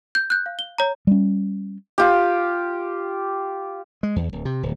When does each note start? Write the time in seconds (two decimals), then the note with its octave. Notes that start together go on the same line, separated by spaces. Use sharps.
0.15 G6
0.30 F#6 G6
0.46 F5
0.59 G7
0.78 C#5 A#5
1.07 G3 C#4
1.98 F4 G4
4.03 G#3
4.16 E2
4.33 D1
4.45 C3
4.63 D1